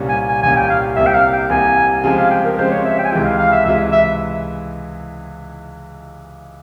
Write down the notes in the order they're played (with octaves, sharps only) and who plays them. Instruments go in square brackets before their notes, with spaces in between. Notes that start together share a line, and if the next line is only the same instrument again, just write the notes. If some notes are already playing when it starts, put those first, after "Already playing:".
Already playing: [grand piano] C2 A#2 G3 C#4
[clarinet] G#5
G#5
[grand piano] C2 A#2 G3 C#4 [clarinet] G#5
[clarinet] G5
F5
[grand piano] C2 C3 G3 A#3 [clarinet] E5
[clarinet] G5
F5
G5
[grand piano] C2 C3 G3 A#3 [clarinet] G#5
[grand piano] C#3 F3 G#3 C4 G4 [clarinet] G#5
[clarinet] F5
G5
A#4
[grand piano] C#3 F3 G#3 C4 G4 [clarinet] C5
[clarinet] C#5
E5
G5
G#5
[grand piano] C#2 C3 E3 G#3 E4 [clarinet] G5
[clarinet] F5
F5
E5
[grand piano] C#2 C3 E3 G#3 E4 [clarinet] E5
[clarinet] E5